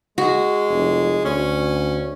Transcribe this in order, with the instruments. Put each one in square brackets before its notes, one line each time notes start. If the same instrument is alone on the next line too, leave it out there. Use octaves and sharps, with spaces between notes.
[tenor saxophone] G#3 [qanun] F#4
[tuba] F1
[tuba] D2 [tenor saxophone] C#4